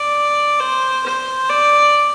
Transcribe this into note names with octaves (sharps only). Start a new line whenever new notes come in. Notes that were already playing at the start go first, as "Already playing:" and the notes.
Already playing: D5
C5
C5
D5